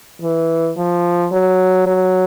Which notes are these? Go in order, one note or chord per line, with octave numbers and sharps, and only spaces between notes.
E3
F3
F#3
F#3